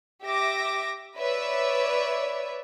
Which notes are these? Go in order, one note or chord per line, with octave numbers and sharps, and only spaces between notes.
G4 E5 D6 A#6
B4 C#5 D5 E5